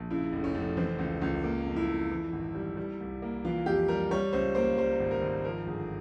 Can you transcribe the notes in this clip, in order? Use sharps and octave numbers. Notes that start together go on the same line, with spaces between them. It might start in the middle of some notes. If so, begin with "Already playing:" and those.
Already playing: A#1
C#3 E4
F1
C#4
F1
E3 C4
C#2
C#2
A#3
F2
E4
F2
E3
G#1
G3
G3
C2
A#3
E3 F4
F2 G4
G3 A#4
G3 C#5
C#2 C5
A#3 C5
G3 C5
G#1
A#4
G#1
F3 A#4
G1 G#4